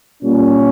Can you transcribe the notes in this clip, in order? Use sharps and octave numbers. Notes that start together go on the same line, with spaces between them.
A#2 G3 C#4